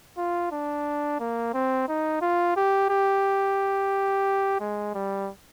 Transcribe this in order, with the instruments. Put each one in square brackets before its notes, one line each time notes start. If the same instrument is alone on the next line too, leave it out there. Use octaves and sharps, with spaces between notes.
[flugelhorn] F4
D4
A#3
C4
D#4
F4
G4
G4
G#3
G3